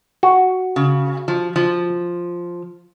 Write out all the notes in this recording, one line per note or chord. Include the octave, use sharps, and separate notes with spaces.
F#4
C#3
F3
F3